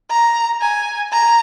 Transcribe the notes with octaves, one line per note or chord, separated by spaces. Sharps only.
A#5
G#5
A#5